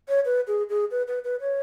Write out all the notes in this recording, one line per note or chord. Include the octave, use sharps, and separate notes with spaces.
C#5
B4
G#4
G#4
B4
B4
B4
C#5